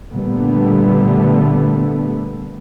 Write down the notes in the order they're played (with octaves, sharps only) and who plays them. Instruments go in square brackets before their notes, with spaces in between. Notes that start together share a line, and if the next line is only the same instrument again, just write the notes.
[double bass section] A#2 D3 G3 A3 B3